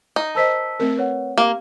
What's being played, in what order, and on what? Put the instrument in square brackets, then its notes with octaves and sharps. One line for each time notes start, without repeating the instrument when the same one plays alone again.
[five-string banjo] D#4
[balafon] A#4 C5 D#5 [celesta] A5 E6 B6
[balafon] A3 C4 A#4
[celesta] B4 C#5 F#5
[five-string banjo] A#3 [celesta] G4